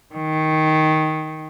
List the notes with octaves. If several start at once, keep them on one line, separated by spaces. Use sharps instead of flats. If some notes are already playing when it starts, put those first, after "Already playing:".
D#3